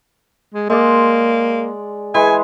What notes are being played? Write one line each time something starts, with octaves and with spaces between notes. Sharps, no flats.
G#3
G#3 A#3 D5
E3 G#3 G#5